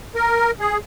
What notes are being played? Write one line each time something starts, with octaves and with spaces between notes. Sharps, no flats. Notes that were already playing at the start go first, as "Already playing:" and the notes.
A#4
G#4